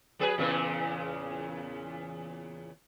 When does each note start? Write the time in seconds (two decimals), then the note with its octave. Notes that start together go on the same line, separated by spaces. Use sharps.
0.19 F#3 G#4 B4
0.38 E2 A#2 C#3